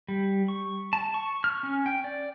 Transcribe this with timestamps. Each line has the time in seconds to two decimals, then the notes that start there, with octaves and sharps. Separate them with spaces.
0.08 G3
0.48 C#6
0.93 A5
1.14 C#6
1.44 F6
1.63 C#4
1.86 G5
2.04 D5